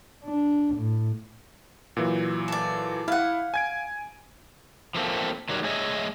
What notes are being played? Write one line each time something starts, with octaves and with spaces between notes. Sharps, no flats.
D4
A2
A#2 E3 F#3
A4 D5
E4 F5 F#5
G#5 G#6 D7
F3 A3 A#3 C4
D#3 F#3 G3
A3 G#4 C#5 D#5 E5